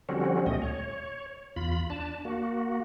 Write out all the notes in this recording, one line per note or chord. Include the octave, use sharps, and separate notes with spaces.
D3 F3 G3 C4 C#4 F#4
D2 A#2 A3 D#5
C#5
E2 F4 B5
D4 A5
A#3 F#4